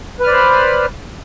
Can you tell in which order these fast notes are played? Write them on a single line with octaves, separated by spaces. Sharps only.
B4 F6 D5 C5 B5